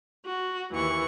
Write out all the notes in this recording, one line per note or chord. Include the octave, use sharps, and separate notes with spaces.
F#4
D#2 E3 C#6